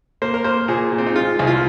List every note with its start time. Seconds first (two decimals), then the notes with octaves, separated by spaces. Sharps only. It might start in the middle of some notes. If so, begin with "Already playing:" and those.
0.22 A#3 C5
0.34 A#4
0.44 A#3 C5
0.68 A#2 G#4
0.92 A#2
0.98 C4
1.06 D#4
1.15 G#3 F4
1.39 C2 G#4
1.47 F4